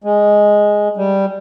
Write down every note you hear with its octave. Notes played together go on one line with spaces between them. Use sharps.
G#3
G3